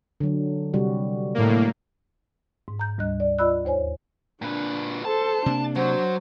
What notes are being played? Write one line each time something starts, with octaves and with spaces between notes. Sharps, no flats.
D3 F#3
C3 G3 F#4
A2 A#3
G#2
A#5 G6
D2 G3 D#5 F#6
D5
F4 D5 D#5 B5 E6 F#6
D#2 C5 C#5 G#5
A#2 D4 B4
A4 C5 A5
C3 A#3 D4
F#3 C5